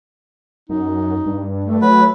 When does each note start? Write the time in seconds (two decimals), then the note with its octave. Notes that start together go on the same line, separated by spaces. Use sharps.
0.69 F#2 D#4
1.26 G2
1.65 A3
1.82 F#3 B4